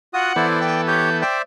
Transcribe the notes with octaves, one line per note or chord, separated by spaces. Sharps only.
F4 F#4 F#5 D#6
E3 B3 E4 A4 C5 D5
D5 G5
G4 C#5 G6
C5 D5 E5 G5